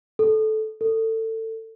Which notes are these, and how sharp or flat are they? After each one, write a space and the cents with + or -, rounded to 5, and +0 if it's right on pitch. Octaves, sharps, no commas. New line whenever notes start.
A4 -15
A4 +25